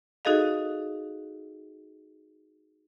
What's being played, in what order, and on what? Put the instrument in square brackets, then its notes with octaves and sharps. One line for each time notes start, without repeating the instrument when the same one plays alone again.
[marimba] D#4 F#4 G#4 A4 D#5 F5